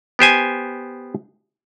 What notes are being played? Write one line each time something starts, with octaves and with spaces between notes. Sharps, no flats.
B3 G4 C5 G#5